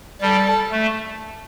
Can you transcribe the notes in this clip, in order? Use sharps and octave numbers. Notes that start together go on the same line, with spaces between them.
G3 A4
A3